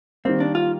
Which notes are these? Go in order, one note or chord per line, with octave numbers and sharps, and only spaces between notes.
D#3 G3 A#3 C4
D4
F4